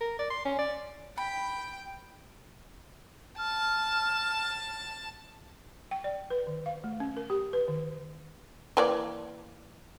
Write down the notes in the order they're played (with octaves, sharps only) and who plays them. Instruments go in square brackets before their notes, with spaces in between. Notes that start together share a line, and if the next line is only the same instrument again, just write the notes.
[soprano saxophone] A#4
D5
C6
C#4
D5
[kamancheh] G5 [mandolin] B5
[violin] A5 [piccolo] F6
[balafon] G5
D5
B4
D#3
F5
A3
C#4
A#4
G4
B4
D#3
[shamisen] E3 A#3 D5